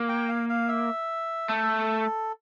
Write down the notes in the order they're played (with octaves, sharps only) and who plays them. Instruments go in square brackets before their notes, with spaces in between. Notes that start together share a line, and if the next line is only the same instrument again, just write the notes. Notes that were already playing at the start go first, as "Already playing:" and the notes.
Already playing: [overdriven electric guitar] A#3
[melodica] G5
F5
F5
E5
[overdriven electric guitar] A3 [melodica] A4